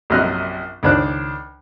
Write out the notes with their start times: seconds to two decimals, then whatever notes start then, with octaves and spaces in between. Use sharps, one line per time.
0.10 A#1 F#2 C3 D#5 F6 F#6
0.83 C#2 D#3 D4 C5 F#6